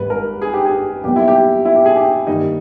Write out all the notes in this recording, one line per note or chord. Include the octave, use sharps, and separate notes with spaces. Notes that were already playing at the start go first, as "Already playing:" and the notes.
Already playing: G#1 G#2 G3 B4
A#4
G#4
G4
G#4
B1 B2 G3 A#3 G4
E4
G4
E4
G4
G#4
G4
G2 D#3 G3 A#3 D#4